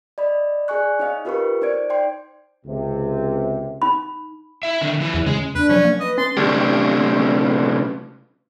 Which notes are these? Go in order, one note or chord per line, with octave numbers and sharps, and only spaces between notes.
D5 D#5 B5
G#4 D5 G#5 C#6 F#6
D#4 C#5 D#5 F5
F4 G4 A#4 B4 B5 C#6
D#4 C5 D5 G#6 D7
D5 G5 C6
C#2 C3
D#4 B5
E4 E5
D3 D#3
E3 F3 E4
E2
C#3 G#3
E2 D4 B4
C3 F3 F#3 C#4
A#3
B4 D#5
C#4 C6 A6
C3 A3 C#4 D4 G4